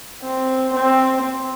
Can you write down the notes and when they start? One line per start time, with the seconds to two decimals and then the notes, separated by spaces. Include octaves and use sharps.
0.23 C4
0.75 C4